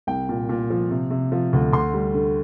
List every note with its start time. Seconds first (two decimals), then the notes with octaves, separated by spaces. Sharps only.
0.07 C2 G5
0.29 A#2
0.49 A#2
0.70 F3
0.91 C3
1.11 C3
1.32 F3
1.53 D2
1.73 D2 C6
1.94 G3
2.14 D3